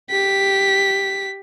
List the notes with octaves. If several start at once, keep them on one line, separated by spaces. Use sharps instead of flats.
G4 B6